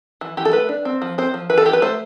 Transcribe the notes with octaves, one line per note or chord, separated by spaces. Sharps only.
E3
E3 G4
A4
A3 B4
D4
C4
F3
C4 C5
F3
E3 B4
A4
E3 G4
B4
A3 C5